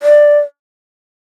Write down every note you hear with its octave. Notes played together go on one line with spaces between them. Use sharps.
D5